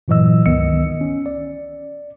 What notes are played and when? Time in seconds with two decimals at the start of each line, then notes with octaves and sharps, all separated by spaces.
0.08 G2 A#2 E3 F#3 D#5 E6
0.46 C#2 D#3 B3 D#5 E6 C#7
1.01 C#4
1.26 D5